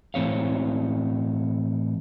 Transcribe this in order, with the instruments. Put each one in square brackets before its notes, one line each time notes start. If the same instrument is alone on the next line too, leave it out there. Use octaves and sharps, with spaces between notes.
[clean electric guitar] A2 E3 C4 C#5 F5